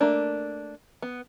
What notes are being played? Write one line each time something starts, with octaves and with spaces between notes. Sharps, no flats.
A3 A#3 D4
B3